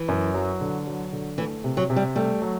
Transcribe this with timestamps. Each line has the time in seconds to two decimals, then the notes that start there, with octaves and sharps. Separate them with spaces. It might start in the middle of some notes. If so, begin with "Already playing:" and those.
Already playing: E3
0.08 F#2
0.34 F#3
0.61 D3
0.87 F#3
1.12 D3
1.38 E3 A3
1.64 C3
1.77 F#3
1.90 C3
1.96 G3
2.16 G3 A3
2.42 F#3